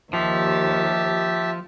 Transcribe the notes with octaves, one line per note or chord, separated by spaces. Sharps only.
D#2 F3 G4 E5 A5